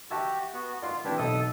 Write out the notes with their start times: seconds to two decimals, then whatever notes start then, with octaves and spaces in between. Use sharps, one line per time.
0.11 F#4 G4 E5 A5
0.53 B3 F#4
0.82 F4 D5 C6
1.04 E3 C4 D4 E4 G4
1.18 B1 A4 D#5 E5 D#6